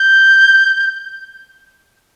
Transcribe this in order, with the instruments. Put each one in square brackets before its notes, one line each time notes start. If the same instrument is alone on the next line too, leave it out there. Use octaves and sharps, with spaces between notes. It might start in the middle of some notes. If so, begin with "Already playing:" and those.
Already playing: [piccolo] G6